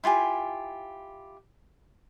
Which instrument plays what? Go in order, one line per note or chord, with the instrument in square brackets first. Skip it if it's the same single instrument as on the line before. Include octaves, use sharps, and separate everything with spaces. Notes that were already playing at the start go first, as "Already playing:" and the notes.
[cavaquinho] E4 F4 G4 G#5